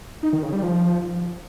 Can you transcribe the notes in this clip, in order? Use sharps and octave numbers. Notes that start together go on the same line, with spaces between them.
D#4
D#3
C#3
G3
F3